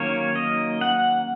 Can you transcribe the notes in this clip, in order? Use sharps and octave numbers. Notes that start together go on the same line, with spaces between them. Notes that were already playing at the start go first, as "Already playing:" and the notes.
Already playing: D#3 F#3 A#3 C#4 C#5
D#5
F#5